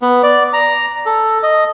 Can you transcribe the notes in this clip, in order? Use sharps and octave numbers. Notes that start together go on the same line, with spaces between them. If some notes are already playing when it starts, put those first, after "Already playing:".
B3
D5
A#5
A4
D#5